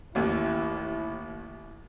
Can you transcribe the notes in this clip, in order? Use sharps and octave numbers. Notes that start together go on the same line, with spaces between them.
A1 D#2 E4